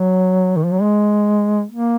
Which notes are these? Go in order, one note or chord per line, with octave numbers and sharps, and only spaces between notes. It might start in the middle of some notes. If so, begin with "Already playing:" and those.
Already playing: F#3
D#3
F3
F#3
G#3
A#3